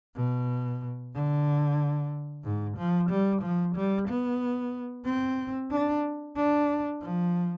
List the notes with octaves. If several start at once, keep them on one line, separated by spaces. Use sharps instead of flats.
B2
D3
G#2
F3
G3
F3
G3
B3
C4
D4
D4
F3